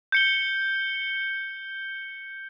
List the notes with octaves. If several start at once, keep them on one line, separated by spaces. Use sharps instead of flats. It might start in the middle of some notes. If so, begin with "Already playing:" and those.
G6 C#7 G7